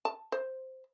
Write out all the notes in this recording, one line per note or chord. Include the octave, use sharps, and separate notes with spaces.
A5
C5